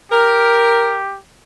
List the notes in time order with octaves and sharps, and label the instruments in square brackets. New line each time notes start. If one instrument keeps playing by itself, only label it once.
[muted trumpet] G4 [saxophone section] A#4